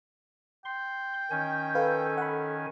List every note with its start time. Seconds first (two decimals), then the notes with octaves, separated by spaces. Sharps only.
0.65 G5 C6
1.31 D#3 C#4 G#5
1.75 A4 B4 F5
2.18 F#5 B5